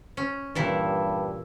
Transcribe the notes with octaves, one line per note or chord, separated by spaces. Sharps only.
C#4
G2 A#2 E3 E4